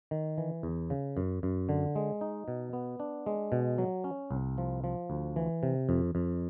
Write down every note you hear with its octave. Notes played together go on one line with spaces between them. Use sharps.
D#3
E3
E2
C#3
F#2
F#2
D3
G#3
D#4
B2
B3
D4
G#3
B2
F#3
C#4
C2
F3
F3
D2
E3
C3
F2
F2